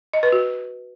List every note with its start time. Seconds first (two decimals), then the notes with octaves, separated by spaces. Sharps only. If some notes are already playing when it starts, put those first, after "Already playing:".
0.13 D#5
0.23 B4
0.32 F#4